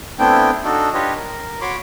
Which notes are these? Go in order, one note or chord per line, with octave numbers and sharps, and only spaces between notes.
A3 B3 C4 D4 E4 G5
D4 D#4 F#4 A4
D4 F4 G4 B4 C#5 D#5
A#4
F#4 C#5 B5 C6 D6